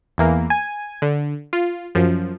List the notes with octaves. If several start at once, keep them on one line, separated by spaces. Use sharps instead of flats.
E2 E3 A#3
G#5
D3
F4
F#2 F3